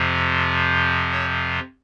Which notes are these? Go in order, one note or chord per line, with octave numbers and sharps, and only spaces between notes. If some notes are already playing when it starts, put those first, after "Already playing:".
Already playing: F2 C3 F3
C#5